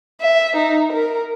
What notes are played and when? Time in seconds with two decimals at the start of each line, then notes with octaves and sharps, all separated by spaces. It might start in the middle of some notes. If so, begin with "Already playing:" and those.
0.21 E5
0.56 D#4
0.92 A#4